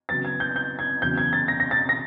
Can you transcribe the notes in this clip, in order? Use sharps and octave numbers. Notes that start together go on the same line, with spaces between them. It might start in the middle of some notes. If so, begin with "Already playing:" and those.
C#3 F#3 B3 A6
G#6
G6
G6
G#6
E2 C#3 F#3 G6
G#6
A6
A#6
A#6
A6
A#6